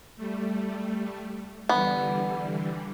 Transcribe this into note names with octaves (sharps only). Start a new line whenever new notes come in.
G3 A3
D3 E3 G3 B3